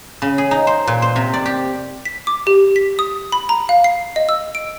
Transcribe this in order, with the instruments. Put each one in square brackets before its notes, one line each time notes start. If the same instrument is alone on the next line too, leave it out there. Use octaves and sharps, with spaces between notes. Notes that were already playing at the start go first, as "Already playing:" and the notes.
[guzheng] C#3
G#4
D#4
C5
A#2
C5
C3
D5
G4
[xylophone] B6
D6
G4
B6
D#6
B5
A#5
F5
C7
D#5
E6
D7